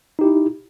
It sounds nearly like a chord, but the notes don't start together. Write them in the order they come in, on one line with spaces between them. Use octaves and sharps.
D#4 G4 E4